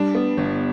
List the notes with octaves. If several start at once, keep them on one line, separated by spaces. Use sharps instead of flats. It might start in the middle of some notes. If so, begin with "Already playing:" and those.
Already playing: G3 D4
B3
G1